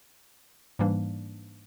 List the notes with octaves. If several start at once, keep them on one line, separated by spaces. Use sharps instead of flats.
G#2 E3 G3 A#3 D4